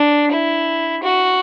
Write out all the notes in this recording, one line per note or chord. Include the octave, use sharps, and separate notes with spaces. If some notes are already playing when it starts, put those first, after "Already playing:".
Already playing: D4
E4
F#4